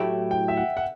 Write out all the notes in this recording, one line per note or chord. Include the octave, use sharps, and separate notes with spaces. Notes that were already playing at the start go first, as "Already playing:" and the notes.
Already playing: A2 F#3 A3 E4 G4
G5
E5
F#5
F#5